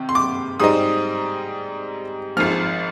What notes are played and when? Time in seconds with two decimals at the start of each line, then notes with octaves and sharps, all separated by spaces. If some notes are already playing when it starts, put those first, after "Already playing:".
Already playing: C3 D#3
0.09 C6
0.15 D6
0.60 G#2 G3 C4 D#4 D#6
2.37 G#1 G#2 F3 F6